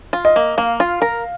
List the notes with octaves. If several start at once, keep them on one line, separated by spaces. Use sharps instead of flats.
F4
D#5
A#3
A#3 F5
F4
A#4